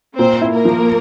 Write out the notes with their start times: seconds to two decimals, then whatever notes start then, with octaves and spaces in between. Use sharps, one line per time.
0.19 A#2 C4 C5
0.41 E4
0.53 A#3 A#4
0.65 F3